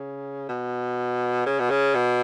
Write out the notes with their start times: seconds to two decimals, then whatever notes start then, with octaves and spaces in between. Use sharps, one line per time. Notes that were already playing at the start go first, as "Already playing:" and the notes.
Already playing: C#3
0.49 B2
1.46 C#3
1.60 B2
1.70 C#3
1.95 B2